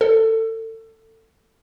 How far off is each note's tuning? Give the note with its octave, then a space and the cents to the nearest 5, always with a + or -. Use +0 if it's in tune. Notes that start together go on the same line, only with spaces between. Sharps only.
A4 +25